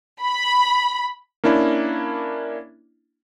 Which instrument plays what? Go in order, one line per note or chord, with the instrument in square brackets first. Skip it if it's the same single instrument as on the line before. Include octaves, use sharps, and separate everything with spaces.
[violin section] B5
[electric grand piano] A#3 C#4 D4 E4